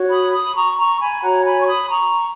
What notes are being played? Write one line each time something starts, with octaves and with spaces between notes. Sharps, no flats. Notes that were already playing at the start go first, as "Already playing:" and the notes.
Already playing: F#4 C#5
B5 D#6
B5 D#6
A#5 C#6
A#5 C#6
G#5 B5
F#4 C#5 F#5 A#5
G#5 B5
C#6
B5 D#6
A#5 C#6